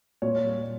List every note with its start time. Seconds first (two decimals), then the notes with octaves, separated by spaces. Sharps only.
0.22 A#2 C#5
0.44 G3